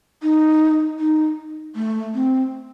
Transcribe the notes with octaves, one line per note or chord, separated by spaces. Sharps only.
D#4
D#4
A3
C4